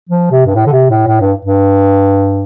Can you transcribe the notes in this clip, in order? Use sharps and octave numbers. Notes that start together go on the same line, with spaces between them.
F3
C3
G2
A2
D3
C3
A2
A2
G2
G2